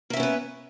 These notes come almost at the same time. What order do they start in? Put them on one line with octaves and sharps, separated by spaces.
A#3 E5 C#4 B3 B4